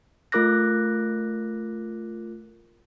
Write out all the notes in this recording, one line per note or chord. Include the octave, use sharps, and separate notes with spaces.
A3 F4 A#4 D6 F#6 A#6